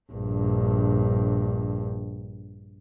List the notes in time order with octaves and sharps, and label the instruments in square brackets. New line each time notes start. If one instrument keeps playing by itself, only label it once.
[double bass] A#1 G2